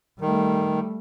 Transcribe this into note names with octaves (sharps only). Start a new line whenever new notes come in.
D#3 G3 A3